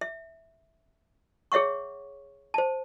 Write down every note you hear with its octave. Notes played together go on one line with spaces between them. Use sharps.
E5
G#4 C#5 E5 F#5 C#6
C5 A5